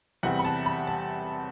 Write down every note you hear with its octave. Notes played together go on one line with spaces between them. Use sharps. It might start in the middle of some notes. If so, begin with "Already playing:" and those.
E2 C3 G3 C4 F#5
B5
A5
B5
A5